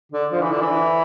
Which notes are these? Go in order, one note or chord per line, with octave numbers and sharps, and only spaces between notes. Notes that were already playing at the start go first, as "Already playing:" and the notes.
D3
F3
E3
D3
E3